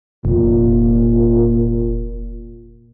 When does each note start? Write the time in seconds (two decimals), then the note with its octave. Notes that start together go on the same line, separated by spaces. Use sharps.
0.25 F1 A#2